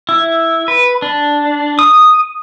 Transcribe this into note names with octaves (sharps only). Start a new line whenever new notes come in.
E4
B4
D4
D#6